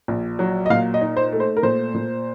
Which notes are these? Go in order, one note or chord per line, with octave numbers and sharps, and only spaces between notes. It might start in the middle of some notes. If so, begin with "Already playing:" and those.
A#1
F#3
D#5
A#2 F5
D#5
D#4
C5
A3
C5
A#4
A#2 C5
A#2